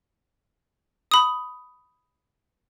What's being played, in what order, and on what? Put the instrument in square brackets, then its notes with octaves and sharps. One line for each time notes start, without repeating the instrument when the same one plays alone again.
[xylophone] B5 D#6